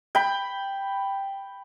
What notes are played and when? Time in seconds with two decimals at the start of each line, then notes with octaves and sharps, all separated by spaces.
0.15 G5 B5